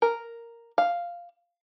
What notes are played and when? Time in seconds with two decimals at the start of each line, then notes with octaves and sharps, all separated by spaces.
0.02 A#4
0.78 F5